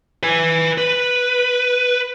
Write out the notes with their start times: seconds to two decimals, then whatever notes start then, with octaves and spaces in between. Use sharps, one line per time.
0.23 B4 G#5
0.78 B4